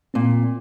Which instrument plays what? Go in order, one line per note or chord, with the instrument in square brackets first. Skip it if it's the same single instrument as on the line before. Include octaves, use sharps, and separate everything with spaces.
[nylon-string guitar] A#2 [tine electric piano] C4